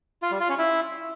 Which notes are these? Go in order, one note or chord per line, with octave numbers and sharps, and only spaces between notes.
F4
G3
F4
C#4
E4